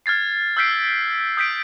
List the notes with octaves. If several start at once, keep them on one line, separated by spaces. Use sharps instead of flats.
F6 G#6 A6 C7
E6 F6 G6 B6 C7 D7
D#6 G6 B6 D7